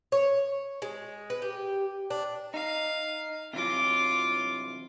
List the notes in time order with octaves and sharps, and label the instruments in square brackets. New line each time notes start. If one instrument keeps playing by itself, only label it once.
[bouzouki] C#5
G#3
B4
G4
D4
[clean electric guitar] D#4 [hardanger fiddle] F5
[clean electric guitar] C3 E3 F#3 [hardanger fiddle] F4 D6